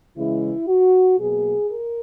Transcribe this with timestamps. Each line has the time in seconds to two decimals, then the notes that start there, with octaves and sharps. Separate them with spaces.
0.16 C#3 E3 G#3 E4
0.68 F#4
1.19 B2 F#3 A#3 G#4
1.71 A#4